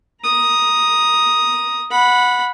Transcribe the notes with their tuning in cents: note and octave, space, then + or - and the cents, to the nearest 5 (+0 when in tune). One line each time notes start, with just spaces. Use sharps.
A#5 +15 D#6 +0
F#5 -20 B5 +0